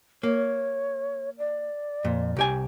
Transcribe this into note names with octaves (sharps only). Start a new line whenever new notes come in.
A#3 C#5
D5
F2 A#2
C2 G4 G#5